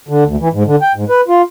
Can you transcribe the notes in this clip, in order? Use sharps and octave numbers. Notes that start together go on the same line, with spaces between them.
D3
D2
E3
G#2
D3
G5
G#2
B4
F4